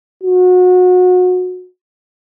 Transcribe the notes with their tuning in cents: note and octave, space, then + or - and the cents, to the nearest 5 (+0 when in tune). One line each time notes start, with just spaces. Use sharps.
F#4 -25